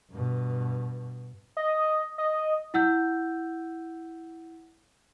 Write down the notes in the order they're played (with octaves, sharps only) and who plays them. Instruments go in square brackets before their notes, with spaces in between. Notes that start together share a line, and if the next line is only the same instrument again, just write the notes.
[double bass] G2 B2
[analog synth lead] D#5
D#5
[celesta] E4 F#5 E6 G6